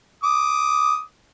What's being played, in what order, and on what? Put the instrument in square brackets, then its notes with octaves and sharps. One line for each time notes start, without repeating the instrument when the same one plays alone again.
[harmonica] D6 D#6